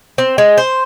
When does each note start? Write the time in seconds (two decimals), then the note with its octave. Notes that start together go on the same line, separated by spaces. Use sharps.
0.18 C4
0.38 G#3
0.58 C5